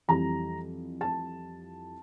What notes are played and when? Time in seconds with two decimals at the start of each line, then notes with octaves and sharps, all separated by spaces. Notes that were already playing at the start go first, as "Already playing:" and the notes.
0.08 F2 E3 G3 A#5
1.01 A5